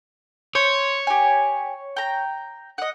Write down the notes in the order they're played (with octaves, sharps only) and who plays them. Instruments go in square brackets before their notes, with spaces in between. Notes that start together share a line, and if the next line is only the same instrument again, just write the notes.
[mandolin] C5 [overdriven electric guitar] C#5
[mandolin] G4 G#5
G5 A#5
D#5 F#5